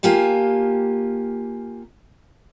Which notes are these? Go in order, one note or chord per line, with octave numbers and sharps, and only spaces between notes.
A#3 F4 G4 G#5 A5